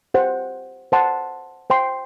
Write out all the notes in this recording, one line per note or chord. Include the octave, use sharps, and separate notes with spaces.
G4 C5 F#5
C5 F#5 A5 C6
C5 G5 C6